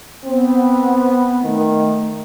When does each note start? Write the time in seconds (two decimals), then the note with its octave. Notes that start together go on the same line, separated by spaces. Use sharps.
0.25 B3 C4
1.43 D#3 A3